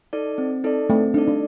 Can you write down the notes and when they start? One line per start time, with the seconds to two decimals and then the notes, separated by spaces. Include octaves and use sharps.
0.13 D#4 A4 D5
0.38 C4
0.64 D#4 A4 D5
0.90 A3 C4
1.14 D4 D#4 A4 D5
1.28 D4